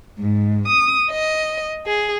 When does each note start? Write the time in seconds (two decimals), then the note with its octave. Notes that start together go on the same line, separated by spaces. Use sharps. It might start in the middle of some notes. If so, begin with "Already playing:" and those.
0.18 G#2
0.69 D#6
1.10 D#5
1.86 G#4